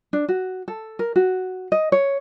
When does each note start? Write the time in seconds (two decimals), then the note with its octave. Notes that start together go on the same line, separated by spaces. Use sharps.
0.13 D4
0.29 F#4
0.68 A4
0.99 A#4
1.16 F#4
1.72 D#5
1.92 C#5